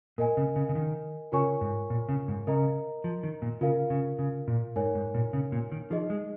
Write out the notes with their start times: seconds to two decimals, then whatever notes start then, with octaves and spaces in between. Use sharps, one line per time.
0.18 A#2 A#4 D#5 G#5
0.37 C#3
0.56 C#3
0.69 C#3
0.75 D#3
1.32 C#3 F4 A#4 C#5 G#5 C#6
1.61 G#2
1.90 A#2
2.09 C#3
2.28 G#2
2.47 C#3 A#4 D#5 A#5
3.04 F3
3.23 D#3
3.42 A#2
3.61 C#3 F4 A#4 F5
3.90 C#3
4.19 C#3
4.48 A#2
4.76 G#2 D#4 A#4 C#5 G#5
4.95 G#2
5.14 A#2
5.33 C#3
5.52 A#2
5.72 D#3
5.90 F3 D#4 G#4 D#5
6.10 G#3